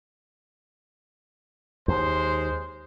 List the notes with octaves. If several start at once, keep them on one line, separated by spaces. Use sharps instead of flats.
D#2 G#3 C5